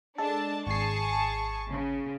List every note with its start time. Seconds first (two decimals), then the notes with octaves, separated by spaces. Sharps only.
0.18 G#3 D4 A4 A5
0.67 G#1 G#4 A5 C#6 C7
1.71 C#3